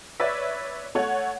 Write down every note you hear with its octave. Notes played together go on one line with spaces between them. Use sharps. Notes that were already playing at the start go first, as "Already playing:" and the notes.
B4 C#5 D5 E5
A3 C#5 F#5